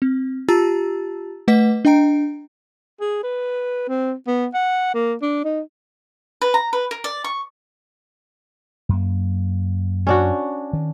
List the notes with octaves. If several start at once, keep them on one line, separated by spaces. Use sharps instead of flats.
C4
F4 G4 A5 A#5 E6 A6
A3 B4 D#5 F#5 B6
D4 D#5 G5 A#5 D7
G#4
B4
C4
B3
F#5
A#3
D4
D#4
B4
A#5
B4
A#4
D5
C#6
F#2 A#3
C#4 D4 F#4
D#3